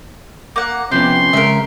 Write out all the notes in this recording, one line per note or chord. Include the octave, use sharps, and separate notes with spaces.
A#3 F#5
C3 F3 B3 C#4 G4 C6
C#3 G#3 A#4 E5